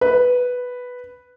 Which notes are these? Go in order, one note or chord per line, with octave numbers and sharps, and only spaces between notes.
B4